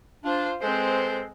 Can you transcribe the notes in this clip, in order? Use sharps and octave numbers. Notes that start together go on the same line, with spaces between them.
D4 F4 C5
G#3 C4 A4 B4 C5